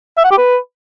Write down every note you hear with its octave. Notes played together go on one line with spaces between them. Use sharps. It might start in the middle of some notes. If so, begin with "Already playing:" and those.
E5
F#5
G4
B4